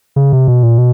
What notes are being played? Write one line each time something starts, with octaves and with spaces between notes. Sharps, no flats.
C#3
C3
B2
A#2
B2